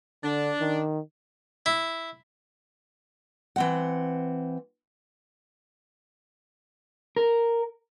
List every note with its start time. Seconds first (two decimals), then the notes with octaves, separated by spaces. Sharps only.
0.24 D3 D4
0.61 D#3
1.66 E4
3.56 E3 C4 F#5
7.17 A#4